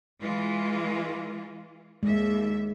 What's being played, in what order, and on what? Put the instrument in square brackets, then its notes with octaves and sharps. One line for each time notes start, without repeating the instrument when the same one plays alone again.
[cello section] E3 G#3 F4
[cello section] D#2 E5 [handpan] G#3